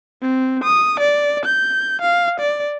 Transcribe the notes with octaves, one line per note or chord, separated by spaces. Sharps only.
C4
D#6
D5
G6
F5
D5